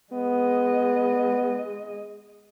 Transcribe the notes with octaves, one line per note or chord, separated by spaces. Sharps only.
G#3 B3 D#5